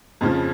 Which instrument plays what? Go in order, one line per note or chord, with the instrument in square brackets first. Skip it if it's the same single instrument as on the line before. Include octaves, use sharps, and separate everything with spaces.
[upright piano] F2 C#3 F3